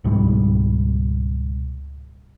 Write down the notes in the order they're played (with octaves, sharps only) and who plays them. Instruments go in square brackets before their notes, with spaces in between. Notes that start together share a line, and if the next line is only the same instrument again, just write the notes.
[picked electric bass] C#2 G#2 B2 G3